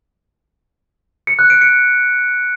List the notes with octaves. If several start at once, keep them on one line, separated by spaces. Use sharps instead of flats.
C#7
F#6
D7
C#7